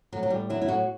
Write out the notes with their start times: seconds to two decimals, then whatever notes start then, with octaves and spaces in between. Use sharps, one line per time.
0.12 A2 F#3
0.23 F#3
0.30 A2 G3
0.50 F#3 E4
0.61 E4
0.68 A2 F#4